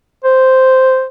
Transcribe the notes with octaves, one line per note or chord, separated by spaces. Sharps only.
C5